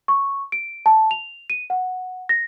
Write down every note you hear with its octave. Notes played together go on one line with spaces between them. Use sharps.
C#6
D7
A5
F7
D#7
F#5
A#6